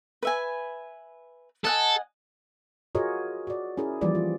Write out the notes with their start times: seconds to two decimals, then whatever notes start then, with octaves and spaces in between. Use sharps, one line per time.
0.23 B4 E5 G#5
1.65 A4 D#5 F#5 G#5
2.95 F4 F#4 G#4 A#4 C#5 D#5
3.47 F#4 D5
3.77 C#4 E4 G#4 A#4
4.01 E3 F3 G3 A#3 D5
4.15 F4